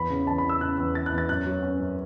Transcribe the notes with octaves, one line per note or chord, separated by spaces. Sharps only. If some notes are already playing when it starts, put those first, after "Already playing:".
Already playing: E2 B5
C#3
E2 A5
B5
E2
E6
C#3 F#6
E2
E3 A6
F#6
E2
A6
F#2 F#6
F#3
C#4
F#2